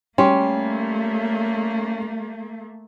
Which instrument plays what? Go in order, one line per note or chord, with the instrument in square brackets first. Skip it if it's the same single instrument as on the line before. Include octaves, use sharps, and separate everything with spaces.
[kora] G3 [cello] A3 A#3 [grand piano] C#4 C6